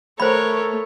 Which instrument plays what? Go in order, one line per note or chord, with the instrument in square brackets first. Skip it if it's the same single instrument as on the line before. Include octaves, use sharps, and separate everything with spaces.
[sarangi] A3 [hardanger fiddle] A#4 C#5 [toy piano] C5 B5